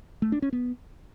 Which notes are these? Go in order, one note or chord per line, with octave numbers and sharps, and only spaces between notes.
A3
D4
C#4
B3